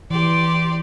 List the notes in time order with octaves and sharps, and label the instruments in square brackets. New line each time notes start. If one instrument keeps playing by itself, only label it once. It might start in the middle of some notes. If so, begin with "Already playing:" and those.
[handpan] E3 [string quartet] G4 D5 C6